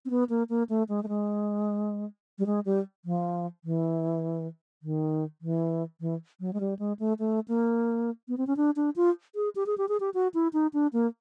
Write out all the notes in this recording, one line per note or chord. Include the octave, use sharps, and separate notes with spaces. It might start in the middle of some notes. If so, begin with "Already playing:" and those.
C4
B3
A#3
A#3
A3
G#3
A3
G#3
G3
G#3
G3
F3
E3
D#3
E3
E3
F#3
G#3
G3
G#3
A3
A3
A#3
B3
C4
C#4
D4
D4
F4
G#4
G4
G#4
G4
G#4
G4
F#4
E4
D#4
D4
A#3